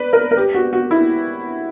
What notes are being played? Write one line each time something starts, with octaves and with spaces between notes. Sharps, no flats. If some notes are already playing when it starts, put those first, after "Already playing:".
Already playing: B4 D5
A#4
A#4
G4
F#4
F#4
E4